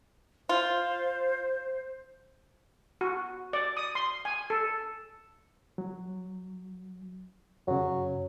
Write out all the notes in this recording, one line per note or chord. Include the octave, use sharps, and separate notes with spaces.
F4 C5
F#4
D5
D#6
C6
G#5
A4
F#3
F#2 C#3 F#3